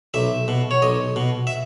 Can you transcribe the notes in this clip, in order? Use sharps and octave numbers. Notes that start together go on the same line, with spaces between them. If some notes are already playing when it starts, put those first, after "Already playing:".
B1 E5
B2
C#5
B1 D#5
B2
E5